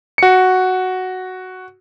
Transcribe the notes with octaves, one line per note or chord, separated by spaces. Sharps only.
F#4 C#7